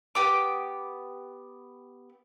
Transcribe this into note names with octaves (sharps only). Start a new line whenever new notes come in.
B3 G4 D6